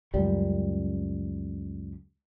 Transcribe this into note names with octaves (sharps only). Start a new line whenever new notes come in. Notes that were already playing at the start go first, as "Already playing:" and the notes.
C#2 F#2 G3